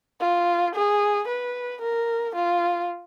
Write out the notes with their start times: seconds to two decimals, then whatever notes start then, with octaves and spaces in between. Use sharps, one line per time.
0.20 F4
0.75 G#4
1.28 B4
1.81 A#4
2.35 F4